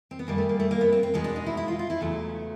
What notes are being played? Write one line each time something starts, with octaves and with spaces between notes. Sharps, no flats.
C4
B3
F#2 D#3 G3 A#3
A3
A#3
A3
A#3
B3
C4
C4
E2 B2 G#3 C#4
D4
D#4
E4
E4
F4
F4
E4
E2 C#3 F#3 A3